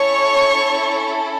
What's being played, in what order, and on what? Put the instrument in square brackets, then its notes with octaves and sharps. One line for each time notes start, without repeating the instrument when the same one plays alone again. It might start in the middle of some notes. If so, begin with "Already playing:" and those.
Already playing: [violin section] C#4 E4 A4 C#5 C#6